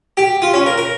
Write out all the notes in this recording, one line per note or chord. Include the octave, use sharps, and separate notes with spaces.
G4
F4
C#4
A#4
A#4